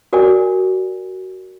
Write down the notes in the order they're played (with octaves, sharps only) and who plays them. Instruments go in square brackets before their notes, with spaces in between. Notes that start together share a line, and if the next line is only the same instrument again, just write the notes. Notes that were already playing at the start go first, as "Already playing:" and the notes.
[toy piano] F#4 A#4 D5 G#5